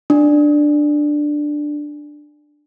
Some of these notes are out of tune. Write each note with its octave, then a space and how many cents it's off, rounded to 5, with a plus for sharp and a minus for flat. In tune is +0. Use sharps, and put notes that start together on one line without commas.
D4 +10